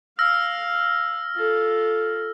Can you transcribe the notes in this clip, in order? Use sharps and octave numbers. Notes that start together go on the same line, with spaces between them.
F5 E6 F6 A#6
F4 A4